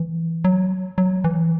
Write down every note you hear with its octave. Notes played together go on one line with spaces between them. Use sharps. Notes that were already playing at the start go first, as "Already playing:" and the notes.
Already playing: E3
F#3
F#3
E3